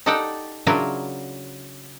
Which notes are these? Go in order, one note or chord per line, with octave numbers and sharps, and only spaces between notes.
D#4 G4 A4 D5 F#5 G5
C#3 F#3 D4 E4 F4 A#4